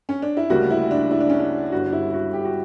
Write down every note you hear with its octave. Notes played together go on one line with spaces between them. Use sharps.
C#4
D4
E4
D2 C#3 G3 A#3 F#4
E4
D4
E4
D4
C#4
D4
G1 G2 D3 F#4
E4
F#4
G4
F#4